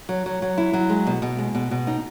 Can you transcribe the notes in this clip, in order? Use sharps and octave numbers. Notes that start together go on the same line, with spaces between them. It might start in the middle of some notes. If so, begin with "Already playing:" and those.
F#3
F#3
F#3
E4
F#3
G#3
B2
B2
G#3
B2
B2
D#4